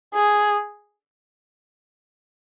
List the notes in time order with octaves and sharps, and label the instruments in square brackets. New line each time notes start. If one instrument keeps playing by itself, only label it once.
[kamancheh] G#4